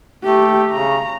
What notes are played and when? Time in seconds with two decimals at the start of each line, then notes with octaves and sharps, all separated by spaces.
0.24 A3 G4
0.72 C#3 A#5